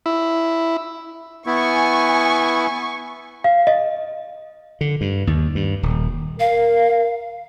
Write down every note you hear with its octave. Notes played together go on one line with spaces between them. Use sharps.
E4
B3 E4 G#5 C#6
F5
D#5
D3
G2
D#2
G2
D#1
A#4 F5